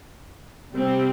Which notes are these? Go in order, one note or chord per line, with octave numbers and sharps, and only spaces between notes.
C3 G3 C4